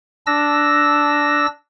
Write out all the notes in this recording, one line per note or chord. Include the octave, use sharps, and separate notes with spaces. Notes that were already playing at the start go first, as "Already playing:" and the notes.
D4 E6 A#6